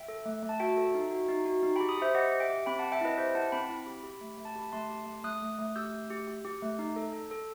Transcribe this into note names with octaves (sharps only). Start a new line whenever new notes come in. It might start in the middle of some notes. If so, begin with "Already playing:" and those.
Already playing: E5 G5
A4
A3
A3
A5
F#4 E5 G5
A4
D#4
F#4
D#4
F#4
D#4
G4 G5 B5
B5 D#6
G4 C5 E5
G4 D#5 F#5
G4
E5 G5
G4
C4 G5 B5
C4 F#5 A5
E5 G5
E4 B4 D#5
G4 C5 E5
E4 F#5 A5
C4 G5 B5
E4
G4
G4
A3
A3
A5
G4 B5
A3 A5 C6
G4
A3
A3 D#6 F#6
A3
A3
G4 E6 G6
A3
G4
G4
G4
A3
D#4
A4
A4
A4